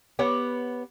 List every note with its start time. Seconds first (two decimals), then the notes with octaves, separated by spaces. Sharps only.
0.19 B3 G4 C#5 F#5